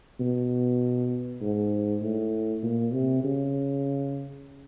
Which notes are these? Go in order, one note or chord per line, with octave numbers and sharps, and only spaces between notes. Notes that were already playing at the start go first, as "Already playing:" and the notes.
B2
G#2
A2
A#2
C3
C#3